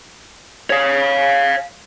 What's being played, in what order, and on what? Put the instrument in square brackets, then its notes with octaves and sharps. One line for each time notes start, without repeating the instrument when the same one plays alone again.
[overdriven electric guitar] C#5 F5